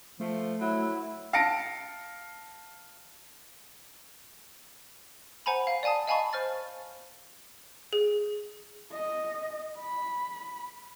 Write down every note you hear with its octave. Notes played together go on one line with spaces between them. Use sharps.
F3 A3
F#3 E4
F5 A5 A#6 C#7 D7
C5 F#5 G#5 A#5 B5
F5
D5 F5 G#5 A5 D#6
D#5 F5 G#5 A5 B5 C#6
C5 F6 A6
G#4
D#5
B5